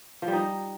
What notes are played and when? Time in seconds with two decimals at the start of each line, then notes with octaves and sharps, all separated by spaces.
0.22 F3
0.28 G3
0.33 D#4